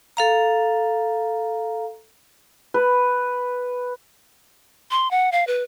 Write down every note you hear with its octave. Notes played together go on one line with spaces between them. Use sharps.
A4 F5 A#5
B4
C6
F#5
F5
B4